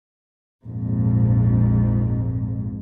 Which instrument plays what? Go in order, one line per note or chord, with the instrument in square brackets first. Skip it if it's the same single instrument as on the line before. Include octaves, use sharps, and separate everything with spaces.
[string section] A#1 F2 G#2